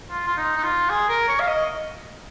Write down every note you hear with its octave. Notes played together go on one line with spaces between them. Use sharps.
F4
F4
D#4
D#4
F4
G#4
A#4
C#5
F5
D#5